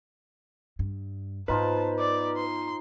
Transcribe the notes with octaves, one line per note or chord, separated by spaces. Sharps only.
G2
G#2 B3 D#4 F4 B4 C5 A5
D5
C6